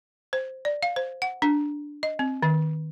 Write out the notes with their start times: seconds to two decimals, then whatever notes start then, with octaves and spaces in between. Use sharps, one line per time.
0.33 C5
0.65 D5
0.83 F5
0.96 C5
1.22 F#5
1.42 D4
2.03 D#5
2.19 C4
2.43 D#3